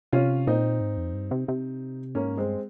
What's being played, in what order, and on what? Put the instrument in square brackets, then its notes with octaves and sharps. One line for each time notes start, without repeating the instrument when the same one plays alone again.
[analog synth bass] C3 [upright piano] C#4 F4
[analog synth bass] A#2 [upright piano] C4 D#4
[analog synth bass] G#2
F2
G2
C3
C3
[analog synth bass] G#2 [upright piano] A#3 C#4
[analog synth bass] G2 [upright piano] G#3 C4